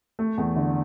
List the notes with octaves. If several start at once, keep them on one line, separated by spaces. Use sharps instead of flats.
A3
E2
D3